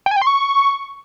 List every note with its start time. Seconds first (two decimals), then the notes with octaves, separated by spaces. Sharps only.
0.06 G5
0.11 G#5
0.16 G5
0.22 C6
0.27 C#6